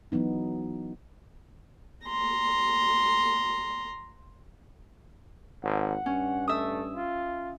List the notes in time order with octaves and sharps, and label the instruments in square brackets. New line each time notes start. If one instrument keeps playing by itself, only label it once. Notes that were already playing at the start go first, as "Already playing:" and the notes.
[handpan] E3 F#3 B3 D#4
[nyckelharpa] A#5 C6
[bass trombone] G#1 [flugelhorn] F#5
[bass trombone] G2 [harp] C#4
[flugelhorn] A3 [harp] E5 D#6
[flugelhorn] F4